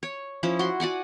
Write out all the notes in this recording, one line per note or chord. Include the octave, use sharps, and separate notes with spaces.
C#5
F3 C#4 E4
F#4 C6
F#4 D5 F#5 G#5